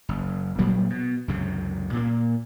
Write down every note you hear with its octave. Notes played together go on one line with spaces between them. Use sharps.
F#1
A#2 F#3 G3 A#3
B2
C#2 F#2 C3
A#2 A#3